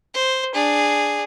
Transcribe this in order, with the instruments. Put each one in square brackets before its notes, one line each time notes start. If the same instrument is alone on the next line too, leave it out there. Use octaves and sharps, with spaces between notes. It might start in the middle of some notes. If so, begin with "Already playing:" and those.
[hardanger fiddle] C5
D4 G#4